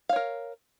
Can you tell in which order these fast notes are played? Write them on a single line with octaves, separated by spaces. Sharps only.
F5 C#5 A#4